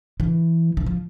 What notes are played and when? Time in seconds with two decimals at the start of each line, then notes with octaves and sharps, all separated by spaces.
0.20 E3
0.77 E3
0.86 F3